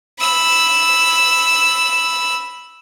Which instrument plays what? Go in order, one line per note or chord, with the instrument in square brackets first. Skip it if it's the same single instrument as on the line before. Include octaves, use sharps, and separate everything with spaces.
[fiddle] B5 E6